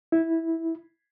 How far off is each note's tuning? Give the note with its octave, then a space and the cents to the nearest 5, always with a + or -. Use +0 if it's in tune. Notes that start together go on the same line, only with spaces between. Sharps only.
E4 -10